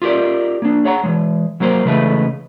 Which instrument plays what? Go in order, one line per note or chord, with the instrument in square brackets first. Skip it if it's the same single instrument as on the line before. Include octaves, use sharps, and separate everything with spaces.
[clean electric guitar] F4 G4 A#4 D5
A#3 D4
G#4 C#5 F#5 A#5
E3 G#3
F#3 A#3 A#4 C5
C#3 E3 G#3 A3 B4